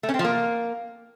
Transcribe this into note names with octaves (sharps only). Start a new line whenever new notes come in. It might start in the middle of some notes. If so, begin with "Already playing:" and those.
A3
C#4
C4
F3
A#3